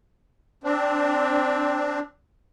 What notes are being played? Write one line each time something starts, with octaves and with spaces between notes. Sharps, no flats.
C4 D4